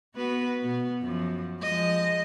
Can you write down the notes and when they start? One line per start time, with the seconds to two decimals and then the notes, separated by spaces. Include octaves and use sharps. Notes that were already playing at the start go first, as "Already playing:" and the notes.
0.15 B3 F#4 B4
0.59 B2 B3
1.00 F#2 F3
1.61 F3 G#3 D#5